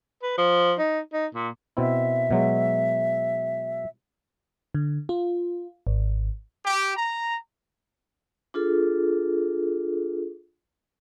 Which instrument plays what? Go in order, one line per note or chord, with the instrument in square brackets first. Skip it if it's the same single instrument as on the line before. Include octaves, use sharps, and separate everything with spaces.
[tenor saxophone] B4
F3
D#4
D#4
A#2
[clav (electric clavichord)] B2 C4 E4 [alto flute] E5
[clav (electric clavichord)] B2 F#3 G#3
[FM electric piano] D3
F4
G#1
[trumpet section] G4
A#5
[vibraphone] D4 F4 G#4 A4